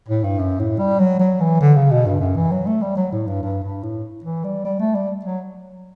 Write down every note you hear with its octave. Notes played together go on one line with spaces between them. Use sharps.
A2
G2
F#2
A2
G3
F#3
F#3
E3
D3
C#3
B2
G2
F#2
E3
F#3
A3
G3
F#3
A2
G2
G2
G2
A2
E3
G3
G3
A3
G3
F#3